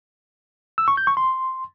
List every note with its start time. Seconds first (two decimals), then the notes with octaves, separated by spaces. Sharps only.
0.78 E6
0.88 C#6
0.97 G6
1.07 C#6
1.17 C6